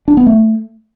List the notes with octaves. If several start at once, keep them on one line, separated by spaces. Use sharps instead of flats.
D4
B3
A3